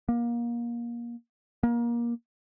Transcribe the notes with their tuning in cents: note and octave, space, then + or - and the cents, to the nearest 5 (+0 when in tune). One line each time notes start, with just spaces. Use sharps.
A#3 +25
A#3 +25